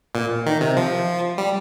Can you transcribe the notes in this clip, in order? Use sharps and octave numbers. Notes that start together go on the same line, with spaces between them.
A#2
D#3
C3
F3
G3